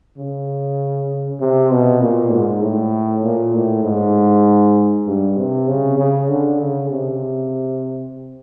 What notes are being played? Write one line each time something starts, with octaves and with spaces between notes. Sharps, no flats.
C#3
C3
B2
A#2
G#2
A2
A#2
A2
G#2
G2
C3
C#3
C#3
D3
C#3
C3